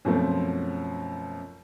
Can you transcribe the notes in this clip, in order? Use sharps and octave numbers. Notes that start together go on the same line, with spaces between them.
F#2 B2 F3 A3 C4